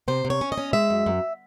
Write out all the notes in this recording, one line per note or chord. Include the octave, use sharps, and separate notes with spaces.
C3 C5
C3
C#5
C#4
D#5
C#4
G#3 E5
F#2
F#2